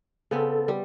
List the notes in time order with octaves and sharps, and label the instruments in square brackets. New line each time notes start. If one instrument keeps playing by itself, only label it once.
[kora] C#3 B3 C4 [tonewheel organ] A4
[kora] G3